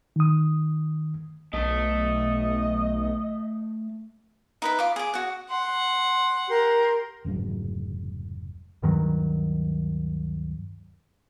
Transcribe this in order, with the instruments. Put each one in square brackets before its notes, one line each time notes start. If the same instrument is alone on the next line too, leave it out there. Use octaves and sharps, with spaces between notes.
[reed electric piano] D#3 D#6
[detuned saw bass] B1 [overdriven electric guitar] A3 A5 [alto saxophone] D#5
[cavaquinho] D#4 B4 E5
F4 D6
G#4 D6
F#4 F#5
[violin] F#5 [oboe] C6
[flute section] G4 A#4 C6
[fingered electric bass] F1 C#2 G#2 F#3
[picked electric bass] D2 G2 D#3 F#3